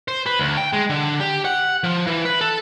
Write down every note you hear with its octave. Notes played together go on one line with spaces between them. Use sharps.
C5
B4
D2
G5
G#3
D3
G4
F#5
F3
E3
B4
A4